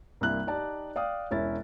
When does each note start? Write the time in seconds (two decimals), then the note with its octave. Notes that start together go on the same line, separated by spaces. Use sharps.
0.21 C2 G2 A#3 E4 F#6
0.47 D#4 G4 D5 A5
0.96 D5 F5 G5 D#6
1.31 E1 C#4 E4 A#4 A6